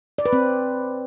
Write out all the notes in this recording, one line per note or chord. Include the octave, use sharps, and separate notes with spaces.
D5
B4
C4